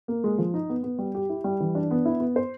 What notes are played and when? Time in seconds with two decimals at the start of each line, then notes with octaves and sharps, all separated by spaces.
0.08 A#3
0.24 G#3
0.38 F3
0.54 D#4
0.69 B3
0.83 B3
0.99 G3
1.15 G4
1.29 E4
1.44 G3
1.60 E3
1.75 D4
1.91 B3
2.05 E4
2.20 B3
2.36 C5